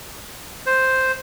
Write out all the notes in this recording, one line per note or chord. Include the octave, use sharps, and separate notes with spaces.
C5